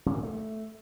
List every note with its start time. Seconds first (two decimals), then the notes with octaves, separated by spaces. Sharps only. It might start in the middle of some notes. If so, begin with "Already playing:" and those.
0.06 A#2
0.15 A#3
0.23 A3